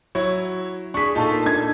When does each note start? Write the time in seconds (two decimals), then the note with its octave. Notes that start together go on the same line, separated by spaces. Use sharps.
0.15 F#3 E4 C#5 G#6
0.94 D4 G#4 C#6 B6
1.15 A#2 D#4 F4 A4 A5
1.32 A#3
1.46 D4 G#6